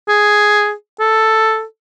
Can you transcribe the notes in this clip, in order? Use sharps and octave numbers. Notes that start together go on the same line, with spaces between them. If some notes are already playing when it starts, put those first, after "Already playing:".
G#4
A4